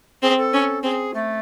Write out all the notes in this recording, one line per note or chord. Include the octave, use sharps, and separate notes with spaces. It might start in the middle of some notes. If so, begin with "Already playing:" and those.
C4 G#4
A4
C#4
C4 G#4
A3